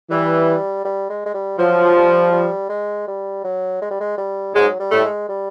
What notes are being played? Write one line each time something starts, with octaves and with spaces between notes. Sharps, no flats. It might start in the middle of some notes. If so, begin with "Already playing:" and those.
E3 G3
G3
G#3
G#3
G3
F3 F#3
G3
G3
G#3
G3
F#3
G#3
G3
G#3
G3
G#2 F#3 G#3
G3
A2 A3
G#3
G3